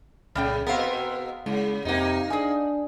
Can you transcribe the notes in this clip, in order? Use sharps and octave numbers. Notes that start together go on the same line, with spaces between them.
C2 A#2 C#3 G3 A3 C#4 G5
B2 B3 C4 G#4 A#4 F5 G5 A#5
C#3 G#3 E4
F2 C3 A#3 D#4
D4 G#4 D5 F5 G#5 D#6